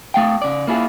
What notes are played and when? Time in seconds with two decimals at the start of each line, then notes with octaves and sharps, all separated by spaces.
0.14 A3 F5 G5
0.42 C#3 D5
0.67 A#3 E4 F4 G#4